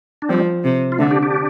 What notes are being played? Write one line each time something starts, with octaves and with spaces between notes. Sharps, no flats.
D4
F3 G3 C4
C3
F4
D3 A3 D4
D4 G4
D4 G4